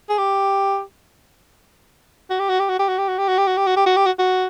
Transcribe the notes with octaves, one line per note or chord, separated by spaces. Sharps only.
G#4
G4
F#4
G4
F#4
G4
F#4
G4
F#4
G4
F#4
G4
F#4
G4
F#4
G4
F#4
G4
F#4
G4
F#4
F#4